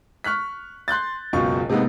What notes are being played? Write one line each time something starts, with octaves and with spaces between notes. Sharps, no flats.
C#6 F6 F#6 B6
C6 F#6 G6 A6
F#1 C#2 B2 F4 C#6
C3 G#3 A#3 B3 D#4